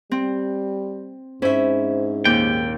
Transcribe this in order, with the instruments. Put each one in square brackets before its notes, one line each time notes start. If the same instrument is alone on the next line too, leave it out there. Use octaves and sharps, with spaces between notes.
[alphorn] G3 [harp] C4
[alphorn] G#2 [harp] C#4 E4 [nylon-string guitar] C5 E5
[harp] D#2 A#2 G6 [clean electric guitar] G5